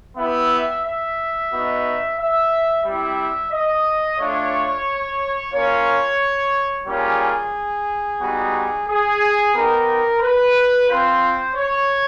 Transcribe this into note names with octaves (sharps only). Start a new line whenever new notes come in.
B3 E4 G4 E5
E5
B3 D#4 F#4
E5
G3 C4 E4 E5
D#5
A3 D4 F4 C#5
A#3 C#4 F4 C#5
G3 A#3 C#4 F4 G#4
G3 B3 D#4 F#4
G#4
B3 D#4 G4 A#4
B4
C4 F4 C5
C#5